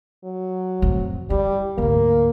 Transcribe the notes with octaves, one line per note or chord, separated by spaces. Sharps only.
F#3
F2 A2
G3 E4
D2 G#2 A#3